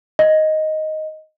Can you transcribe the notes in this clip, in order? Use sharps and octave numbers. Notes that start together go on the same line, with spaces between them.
D#5